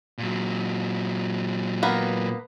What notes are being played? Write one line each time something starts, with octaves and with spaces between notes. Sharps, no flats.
A#2 F#3
A#3 B3